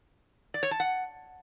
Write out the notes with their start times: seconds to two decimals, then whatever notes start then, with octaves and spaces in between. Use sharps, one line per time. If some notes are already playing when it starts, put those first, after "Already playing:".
0.54 D5
0.63 C#5
0.71 A5
0.80 F#5